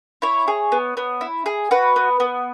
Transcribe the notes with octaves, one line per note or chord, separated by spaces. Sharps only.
E4 C#5
G#4
B3
B3
E4
G#4
F#4 B4
B3
B3